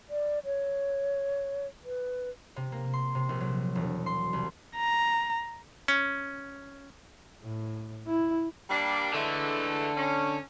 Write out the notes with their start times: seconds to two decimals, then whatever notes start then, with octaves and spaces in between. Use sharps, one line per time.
0.10 D5
0.45 C#5
1.85 B4
2.56 C3
2.72 A#3
2.93 C6
3.15 C3
3.29 A#1
3.40 F#3
3.75 E1
4.06 C6
4.33 C2
4.76 A#5
5.88 C#4
7.43 A2
8.07 E4
8.70 G3 A#3 D4
9.14 D3 E3 G#3 A3
9.97 C#4